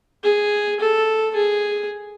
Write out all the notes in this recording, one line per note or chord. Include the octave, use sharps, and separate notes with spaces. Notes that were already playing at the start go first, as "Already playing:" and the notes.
G#4
A4
G#4